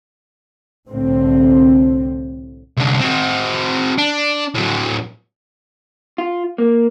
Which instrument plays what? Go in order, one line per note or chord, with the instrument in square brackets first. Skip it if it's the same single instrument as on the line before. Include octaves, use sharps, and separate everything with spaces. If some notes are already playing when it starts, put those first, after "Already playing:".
[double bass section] C2 A2 D3 C4
[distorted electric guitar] C2 D3
C4 F#4
D4
A2 F#3
[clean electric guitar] F4
A#3